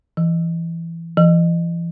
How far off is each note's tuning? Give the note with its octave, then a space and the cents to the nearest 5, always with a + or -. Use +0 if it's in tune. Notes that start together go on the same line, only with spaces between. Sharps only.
E3 +20
E3 +40